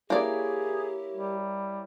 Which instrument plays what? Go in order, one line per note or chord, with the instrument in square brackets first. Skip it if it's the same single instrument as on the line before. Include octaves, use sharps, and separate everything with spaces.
[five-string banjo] A#3 D5 [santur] E4 A#4 C#5 [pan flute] G4 [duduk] G#4
[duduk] G3